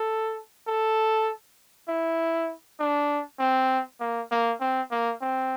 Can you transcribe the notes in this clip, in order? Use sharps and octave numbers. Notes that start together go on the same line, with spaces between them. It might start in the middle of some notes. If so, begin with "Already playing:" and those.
Already playing: A4
A4
E4
D4
C4
A#3
A#3
C4
A#3
C4